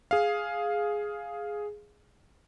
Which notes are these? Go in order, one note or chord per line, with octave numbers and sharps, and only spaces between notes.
G#4 F5